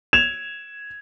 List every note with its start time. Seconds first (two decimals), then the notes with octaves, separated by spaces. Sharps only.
0.13 G#6 E7 F7